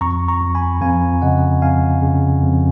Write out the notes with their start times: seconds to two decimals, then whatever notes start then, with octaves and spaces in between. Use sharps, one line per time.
0.01 F2 A#5 C#6
0.28 A#5 C#6
0.42 F2
0.55 G#5 B5
0.81 F2 F5 G#5
1.22 C#3 D#5 F#5
1.62 F2 F5 G#5
2.03 C#3
2.43 F2